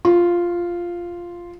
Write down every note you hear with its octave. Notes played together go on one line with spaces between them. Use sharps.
F4